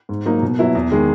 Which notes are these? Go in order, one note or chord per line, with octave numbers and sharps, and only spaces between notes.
G#2
F#3 A#3 D#4
B2
F#3 B3 E4
E2
D#3 G#3